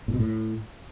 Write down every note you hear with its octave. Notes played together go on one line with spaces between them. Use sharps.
A#2
B2
A2